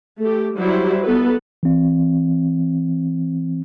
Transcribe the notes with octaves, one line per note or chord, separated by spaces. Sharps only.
A3 G4
F#3 G3 E4 C5
B3 A4 B4
E3 C4